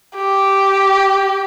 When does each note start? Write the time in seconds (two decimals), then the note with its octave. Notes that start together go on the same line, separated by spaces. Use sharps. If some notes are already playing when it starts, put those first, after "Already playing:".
0.16 G4